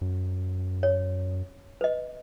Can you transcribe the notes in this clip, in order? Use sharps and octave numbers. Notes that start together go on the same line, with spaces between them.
F#2
C#5
B4 D#5